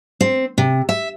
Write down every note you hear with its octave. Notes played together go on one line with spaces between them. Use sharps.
C4
C3
E5